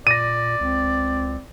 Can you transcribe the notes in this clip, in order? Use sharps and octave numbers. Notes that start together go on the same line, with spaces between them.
A#2 D5 A#6 D#7
C#2 C4